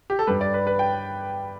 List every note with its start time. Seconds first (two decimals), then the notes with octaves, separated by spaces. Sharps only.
0.10 G4
0.19 A4
0.27 G2 G3 B4
0.41 D5
0.54 B4
0.67 B4
0.79 G5